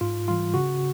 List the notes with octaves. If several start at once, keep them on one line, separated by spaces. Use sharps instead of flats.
G#2 F4
E3 G3 F4
C#3 F#4